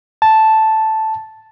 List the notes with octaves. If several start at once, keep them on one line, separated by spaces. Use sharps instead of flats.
A5